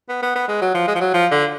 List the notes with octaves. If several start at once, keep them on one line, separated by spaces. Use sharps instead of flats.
B3
B3
B3
G#3
F#3
F3
G#3
F3
F#3
F3
D3